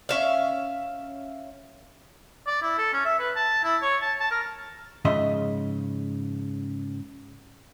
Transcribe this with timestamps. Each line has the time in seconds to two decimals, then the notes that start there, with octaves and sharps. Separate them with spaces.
0.09 C#4 E5 F5
2.47 D5
2.62 E4
2.78 A4
2.93 C#4
3.05 E5
3.19 B4
3.35 A5
3.64 E4
3.82 C#5
4.02 A5
4.20 A5
4.31 A#4
5.05 G#2 C#3 F3 D#5 E5 C6